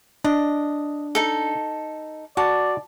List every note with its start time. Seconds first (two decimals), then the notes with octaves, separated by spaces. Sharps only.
0.24 D4 D#5
1.15 D#4 A4
2.37 F#4 D5 A5